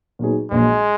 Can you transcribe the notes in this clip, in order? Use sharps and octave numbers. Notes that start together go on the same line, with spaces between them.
A#2 F#3 B3 D#4 G#4
A#1 A#2 F#3 G#3